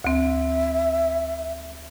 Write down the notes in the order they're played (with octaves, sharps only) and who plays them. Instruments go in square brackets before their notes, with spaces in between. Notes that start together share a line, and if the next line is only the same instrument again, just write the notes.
[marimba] D2 C4 [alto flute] E5